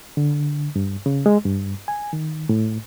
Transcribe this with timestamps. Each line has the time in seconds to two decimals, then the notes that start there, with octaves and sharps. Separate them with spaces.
0.17 D3
0.76 G2
1.06 C#3
1.26 G#3
1.45 G2
1.88 G#5
2.13 D#3
2.49 A2